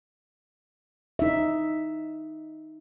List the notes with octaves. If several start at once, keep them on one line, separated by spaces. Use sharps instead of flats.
D#4 E5